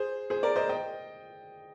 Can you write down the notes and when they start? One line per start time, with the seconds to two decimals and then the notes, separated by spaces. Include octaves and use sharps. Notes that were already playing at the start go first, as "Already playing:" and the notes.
Already playing: G#4 C5
0.30 G#4 C5
0.43 A#4 D5
0.56 C5 D#5
0.69 D#5 G5